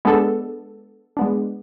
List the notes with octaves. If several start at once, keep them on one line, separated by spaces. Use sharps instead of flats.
G#3 B3 D4 A4
G#3 B3 D4